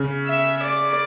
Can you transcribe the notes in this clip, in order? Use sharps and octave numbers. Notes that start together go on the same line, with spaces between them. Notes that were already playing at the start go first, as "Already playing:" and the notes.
Already playing: C#3
E5
D5